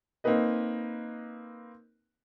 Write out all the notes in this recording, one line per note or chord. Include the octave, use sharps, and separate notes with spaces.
A#3 C4 D#4 B4 D#5